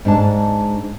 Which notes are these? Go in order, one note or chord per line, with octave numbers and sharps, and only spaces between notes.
G#2 D4 A5